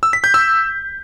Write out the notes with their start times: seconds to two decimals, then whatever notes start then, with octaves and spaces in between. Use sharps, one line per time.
0.03 E6
0.13 B6
0.24 G6
0.34 E6